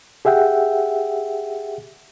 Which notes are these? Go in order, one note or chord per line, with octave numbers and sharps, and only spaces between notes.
G4 G#4 E5 F#5 G5